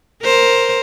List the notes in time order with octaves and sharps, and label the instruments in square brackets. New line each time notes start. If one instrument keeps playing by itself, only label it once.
[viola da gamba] A#4 C5